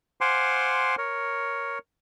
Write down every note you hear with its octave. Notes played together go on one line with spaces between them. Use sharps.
C5 F5 F#5 G#5 C6 D6
A#4 C#5